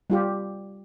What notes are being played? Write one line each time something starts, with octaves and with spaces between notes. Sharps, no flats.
G3 F4 G4